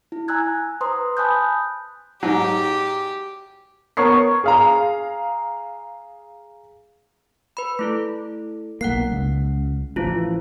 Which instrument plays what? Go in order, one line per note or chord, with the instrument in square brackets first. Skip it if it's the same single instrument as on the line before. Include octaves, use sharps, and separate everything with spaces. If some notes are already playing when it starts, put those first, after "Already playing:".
[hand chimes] E4
G#5 A#5 E6 F#6 G#6
B4 C5 A#5 C6 D#6
G#5 A5 B5 D#6 F#6 G6
[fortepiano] G#2 F#3 [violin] G4
[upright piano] B3 A#4 C#5 C#6 C7
G#4 F5 A#5
[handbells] B4 B5
A3 E4 A4
[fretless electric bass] B1 A#3 [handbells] F#5 F#6 C7
[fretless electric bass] C#2
[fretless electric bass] A1 E3 F3 [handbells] E4 F4